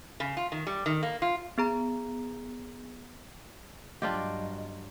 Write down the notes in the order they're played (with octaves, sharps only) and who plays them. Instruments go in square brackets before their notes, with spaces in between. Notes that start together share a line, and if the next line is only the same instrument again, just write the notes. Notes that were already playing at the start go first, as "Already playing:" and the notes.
[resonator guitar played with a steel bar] C#3
F4
D#3
G3
D#3
A#3
F4
[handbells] B3 G#4 A#5
[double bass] G2 F#3 [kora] D4 F4 G4 [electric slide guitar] D#5